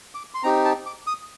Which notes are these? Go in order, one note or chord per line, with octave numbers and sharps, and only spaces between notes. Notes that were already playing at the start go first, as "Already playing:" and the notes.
D6
C6
C4 D#4 G4 A#5
A5
D6
D#6